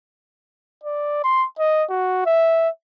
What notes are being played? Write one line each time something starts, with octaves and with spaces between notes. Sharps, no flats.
D5
C6
D#5
F#4
E5